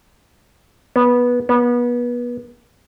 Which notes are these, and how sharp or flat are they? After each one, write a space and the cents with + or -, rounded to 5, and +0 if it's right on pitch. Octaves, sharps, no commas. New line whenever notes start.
B3 -15
B3 -30